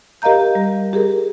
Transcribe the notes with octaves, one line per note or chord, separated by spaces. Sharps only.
G4 A#4 D#5 F5 A#5 G6
G3
G4 G#4 A#4